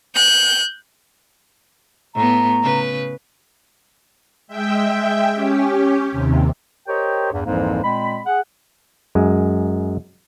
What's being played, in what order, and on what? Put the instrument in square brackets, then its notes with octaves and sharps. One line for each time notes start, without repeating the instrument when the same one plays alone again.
[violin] F#6 G6
[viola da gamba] A2 B3 [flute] A#5
[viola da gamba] C#3 B4
[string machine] G#3 E5 G5
C#4 G4
D#2 C3
[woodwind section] G4 A#4 C5 C#5 D#5 G5
E2 G2
C2 F2 G#2 E3 F3 A#3
A#2 G#3 C4 B5
G#4 F#5
[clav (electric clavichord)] F#2 G#3